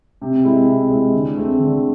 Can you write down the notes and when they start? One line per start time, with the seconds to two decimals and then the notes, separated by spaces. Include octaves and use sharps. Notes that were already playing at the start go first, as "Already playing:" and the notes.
0.22 C3
0.44 G#3 C4 E4
0.67 C3
0.90 G#3 C4 E4
1.14 D3
1.37 A3 C4 G#4
1.59 D3